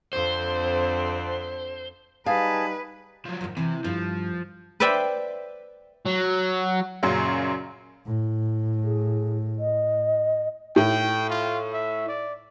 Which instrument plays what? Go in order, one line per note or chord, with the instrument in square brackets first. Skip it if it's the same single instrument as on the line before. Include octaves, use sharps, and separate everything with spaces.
[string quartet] F2 D3 C4 [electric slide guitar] C5
[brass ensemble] G3 D#4 [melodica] G#4 A5 [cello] B4 [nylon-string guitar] F5
[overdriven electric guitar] F3 F#3
[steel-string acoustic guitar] G#2 D#3
[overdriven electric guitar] C3 [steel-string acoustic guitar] E3
[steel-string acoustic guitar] G2 [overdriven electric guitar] F3
[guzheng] B4 C5 D5 E5 G5 B5
[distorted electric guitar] F#3
[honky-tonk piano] F#2 A#2 C#3 F#3
[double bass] A2
[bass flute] G#4
D#5
[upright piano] A2 [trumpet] G5
[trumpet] F4
E5
D5